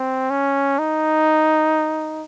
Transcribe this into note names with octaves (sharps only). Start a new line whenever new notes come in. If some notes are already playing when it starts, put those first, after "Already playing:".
Already playing: C4
C#4
D#4